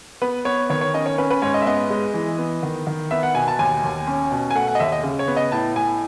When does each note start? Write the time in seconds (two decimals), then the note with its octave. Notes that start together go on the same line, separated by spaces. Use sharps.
0.22 B3 B4
0.45 B3 C#5
0.70 D#3 C#5
0.81 C#5
0.94 C#4 D#5
1.06 C#5
1.18 C#4 B4
1.30 B4
1.42 G#2 C#5
1.54 D#5
1.62 E5
1.66 B3 D#5
1.90 G#3
2.14 E3
2.38 B3
2.63 D#3
2.87 D#3
3.11 B3 E5
3.23 F#5
3.35 B2 G#5
3.48 A5
3.59 D#2 G#5
3.84 D#2
4.07 C#4
4.32 B2
4.51 G#5
4.55 A3 F#5
4.68 F#5
4.75 D#5
4.80 D#2 E5
4.92 D#5
5.03 C#3
5.19 C#5
5.28 B3
5.37 D#5
5.52 A2 A5
5.76 A2 G#5